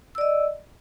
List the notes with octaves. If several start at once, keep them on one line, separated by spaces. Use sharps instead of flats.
D5 D#5 E6